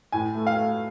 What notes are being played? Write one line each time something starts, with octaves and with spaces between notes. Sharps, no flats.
A2 G#5
A3
F5
A3